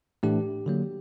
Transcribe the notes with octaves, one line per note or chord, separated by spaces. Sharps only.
A2 E3 A3 D4 G4
D3 F#3 A#3